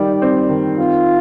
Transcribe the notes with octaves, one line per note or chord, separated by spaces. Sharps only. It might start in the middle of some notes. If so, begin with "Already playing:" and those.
Already playing: D#3 G3 D#4 D5
C4
D#3
C4 F4